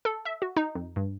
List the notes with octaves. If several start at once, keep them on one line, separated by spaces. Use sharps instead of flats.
A4
E5
F#4
D#4
F2
G2